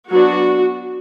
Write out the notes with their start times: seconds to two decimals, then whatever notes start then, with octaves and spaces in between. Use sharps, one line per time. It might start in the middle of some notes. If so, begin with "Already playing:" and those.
0.10 F#3 B3 D4 F#4